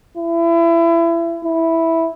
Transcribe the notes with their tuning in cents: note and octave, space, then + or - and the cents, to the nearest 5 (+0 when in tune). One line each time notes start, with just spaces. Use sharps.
E4 +30
E4 -5